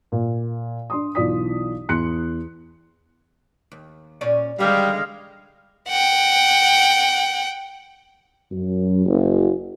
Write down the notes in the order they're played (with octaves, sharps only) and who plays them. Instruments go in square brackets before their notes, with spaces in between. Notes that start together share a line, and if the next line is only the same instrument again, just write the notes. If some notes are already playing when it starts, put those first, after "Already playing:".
[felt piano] A#2
D4 C6 D#6
B1 E3 F4 D5 D#6 B6
E2 C6 F#6 C#7
[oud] D#2
A#2 C#4 D5
[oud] E2 D3 D#3 [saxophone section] G3 [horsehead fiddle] G#3 F5
[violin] F#5 G5
[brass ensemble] F#2
F#1